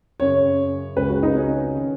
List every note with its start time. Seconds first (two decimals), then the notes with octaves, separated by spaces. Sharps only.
0.20 F#2 C#3 C#5
0.96 C#2 C#3 B4
1.09 F#4
1.23 D#4
1.35 C#4
1.74 D#3